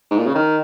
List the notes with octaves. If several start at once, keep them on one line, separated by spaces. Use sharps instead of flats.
G#2
A#2
C#3
D#3